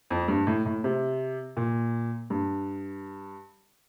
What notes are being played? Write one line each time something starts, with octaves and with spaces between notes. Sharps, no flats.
F2
G2
A2
A2
C3
A#2
G2